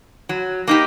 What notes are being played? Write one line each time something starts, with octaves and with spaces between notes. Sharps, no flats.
F#3
A#3 D#4 G4